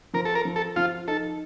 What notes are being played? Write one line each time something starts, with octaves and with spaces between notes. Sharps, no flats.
F3 A#4
A4
A#4
F3
A4
F3 F4
D#4 A4